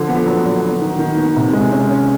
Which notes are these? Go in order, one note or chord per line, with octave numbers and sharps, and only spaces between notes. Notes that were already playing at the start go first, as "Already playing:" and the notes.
Already playing: D3 F3
B3
F#3
F#3
B3
D#3
D#3
B3
C3
G#3
C#4
C#4